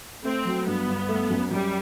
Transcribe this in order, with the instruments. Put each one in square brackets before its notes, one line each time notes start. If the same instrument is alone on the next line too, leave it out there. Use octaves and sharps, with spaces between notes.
[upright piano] A3 [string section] C4
[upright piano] F#3
[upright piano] G2 [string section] B3
[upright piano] G1
A3
F#2
[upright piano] F#2 [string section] G3